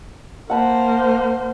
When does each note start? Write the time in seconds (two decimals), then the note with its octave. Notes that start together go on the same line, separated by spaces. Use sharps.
0.50 A#3 C5 F#5 A5 B5